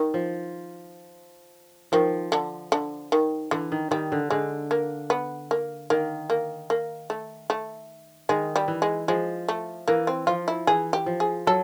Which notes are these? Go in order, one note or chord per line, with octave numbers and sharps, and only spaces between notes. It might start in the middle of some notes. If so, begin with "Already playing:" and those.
Already playing: D#3
F3
D#3 F3
D3
D3
D#3
D3 E3
D#3
D#3 G3
D3
D3 G#3
A#3
B3
A#3
D#3 A#3
A#3
A#3
A3
A3
D#3 G#3
G3
E3
G#3
F3 G#3
A3
E3 A#3
C4
F3 F4
E4
E3 G#4
G4
F3
G#4
F#3 A4